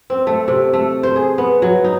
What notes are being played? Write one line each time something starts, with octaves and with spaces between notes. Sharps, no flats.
C4
A3
C3
A3
C5
G#4
B3
F#3
D#4